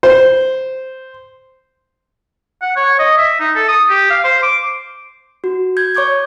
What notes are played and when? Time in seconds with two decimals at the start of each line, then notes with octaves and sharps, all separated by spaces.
0.03 C5
2.62 F#5
2.76 C#5
2.99 D#5
3.18 E5
3.40 D#4
3.56 A4
3.68 D#6
3.90 G4
4.10 F5
4.24 C5
4.43 D6
5.44 F#4
5.77 G6 G#6
5.95 C#5 C#6 D6 G6 G#6